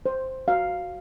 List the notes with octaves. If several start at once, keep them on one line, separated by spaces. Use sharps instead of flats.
C5
F#4 F5